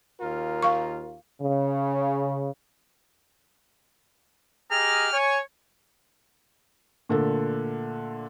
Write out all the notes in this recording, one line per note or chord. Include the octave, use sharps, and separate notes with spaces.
D#2 F4 A#4
F5 C#6
C#3
G4 G#4 D#5 A#5 F6
C#5 G#5
A#2 D3 A3 A4 A#4